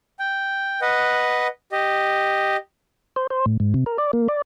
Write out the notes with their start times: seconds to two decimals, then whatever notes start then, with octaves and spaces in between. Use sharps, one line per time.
0.19 G5
0.82 B4 D#5 F#5
1.72 G4 D#5
3.16 C5
3.30 C5
3.46 A2
3.60 G#2
3.74 C3
3.86 A#4
3.98 D5
4.13 A#3
4.28 D5